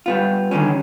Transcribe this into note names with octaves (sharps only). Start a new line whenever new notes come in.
G3 B3 F4
D3 D#3 G3 G#3 C#4